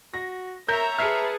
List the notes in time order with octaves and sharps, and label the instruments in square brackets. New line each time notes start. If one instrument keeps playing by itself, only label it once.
[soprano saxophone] F#4 [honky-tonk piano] A#6
[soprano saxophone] A#4 [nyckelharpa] C#5 A#5 [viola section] E5 [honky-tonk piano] G6
[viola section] G#4 B4 A5 [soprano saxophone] E5 [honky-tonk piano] F6 C7 C#7